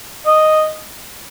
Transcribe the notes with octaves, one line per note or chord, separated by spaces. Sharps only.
D#5